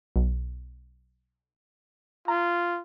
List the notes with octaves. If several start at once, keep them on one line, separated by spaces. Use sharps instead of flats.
B1
F4 A#5